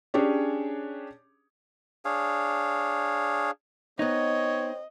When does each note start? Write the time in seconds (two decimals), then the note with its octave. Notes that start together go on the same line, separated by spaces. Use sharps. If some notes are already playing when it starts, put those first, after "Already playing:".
0.14 C#4 D4 G4 G#4 C#5
2.05 D4 G#4 C#5 F5
3.99 B3 C4 D#4 C#5 D#5